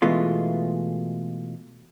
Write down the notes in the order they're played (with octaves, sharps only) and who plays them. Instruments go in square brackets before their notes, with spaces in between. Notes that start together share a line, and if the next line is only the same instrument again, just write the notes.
[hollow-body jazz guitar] B2 E3 G#3 A3 F4